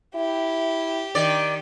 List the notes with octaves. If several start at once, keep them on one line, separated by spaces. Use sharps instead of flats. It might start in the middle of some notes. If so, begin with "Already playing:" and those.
E4 G4
D#3 D5